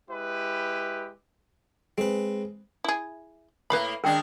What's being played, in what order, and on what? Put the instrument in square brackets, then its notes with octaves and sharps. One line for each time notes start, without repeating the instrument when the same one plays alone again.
[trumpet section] G#3 E4 G4 B4
[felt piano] G#3 [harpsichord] C4 B4
[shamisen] E4 G#4
[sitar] A2 A#3 [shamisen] B4 F5 B5
[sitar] D#3 G#3 D4 [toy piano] A#4 G5